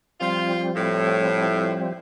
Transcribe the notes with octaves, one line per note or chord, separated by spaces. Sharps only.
F3 G3 C4 F4
A2